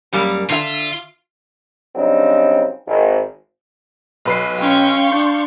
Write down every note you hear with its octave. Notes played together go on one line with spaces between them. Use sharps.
F#2 G3 A#3
D3 F4 E5
C#3 F#3 G3 C4 D4 D#4
G#1
B1 B4 C7
C#4 F5 G5 C6 C#6
D4 G6